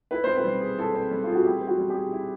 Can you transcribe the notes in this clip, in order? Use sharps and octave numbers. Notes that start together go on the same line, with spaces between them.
E4 B4
C4 C5
B4
G3
G#4
E4 A4
C4
G3
F4 G#4
F#4
E4 G4
C4
F#4
G3
G4
G#4
E4